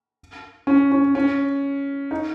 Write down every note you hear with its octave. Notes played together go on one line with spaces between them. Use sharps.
C#4
C#4
C#4
D#4